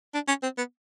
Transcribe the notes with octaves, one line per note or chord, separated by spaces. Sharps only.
D4
C#4
C4
B3